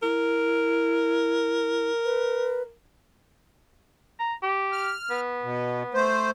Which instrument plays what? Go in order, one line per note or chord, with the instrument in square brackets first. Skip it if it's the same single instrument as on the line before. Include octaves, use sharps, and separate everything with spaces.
[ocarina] E4 [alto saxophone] A#4
[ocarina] B4
[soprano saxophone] A#5
G4
[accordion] F6
[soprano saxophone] B3
[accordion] B2
A3 C5